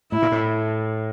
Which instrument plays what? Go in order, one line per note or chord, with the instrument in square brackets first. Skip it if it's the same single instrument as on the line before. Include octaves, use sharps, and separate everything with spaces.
[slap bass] A2 [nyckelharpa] E4
[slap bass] A#2
A2